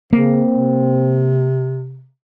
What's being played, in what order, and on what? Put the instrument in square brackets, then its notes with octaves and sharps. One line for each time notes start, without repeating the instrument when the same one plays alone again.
[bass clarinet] C#3 [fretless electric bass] A#3 [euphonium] C4
[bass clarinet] C3